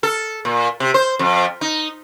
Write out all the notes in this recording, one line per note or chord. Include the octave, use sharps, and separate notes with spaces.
A4
A#2
C3
C5
F2
D#4